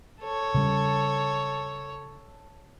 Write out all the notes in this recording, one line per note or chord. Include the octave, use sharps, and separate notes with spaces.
A4 C#5
C#3 G3